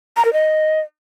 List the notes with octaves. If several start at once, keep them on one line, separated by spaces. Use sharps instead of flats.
A#5
A#4
D#5